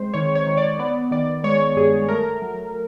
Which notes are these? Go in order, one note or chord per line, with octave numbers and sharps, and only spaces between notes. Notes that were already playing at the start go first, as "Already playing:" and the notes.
Already playing: G#3 C4 C5
D#3 C#5
C#5
D#3
D5
B3 D5
D#3 D5
G#3 C#5
G2 G#4
A3 A#4
F#3